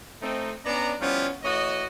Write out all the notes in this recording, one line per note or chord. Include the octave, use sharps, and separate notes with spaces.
A3 C4 D#4
B3 C#4 D4 D5 A#5
F3 G3 B3 C#4 E4 F4
E3 A3 F#4 C#5 D#5